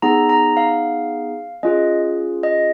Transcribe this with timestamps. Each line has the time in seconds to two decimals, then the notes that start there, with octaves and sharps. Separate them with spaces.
0.02 B3 D#4 G#4 A#5
0.29 A#5
0.57 F5
1.63 C#4 F4 G#4 D#5
2.43 D#5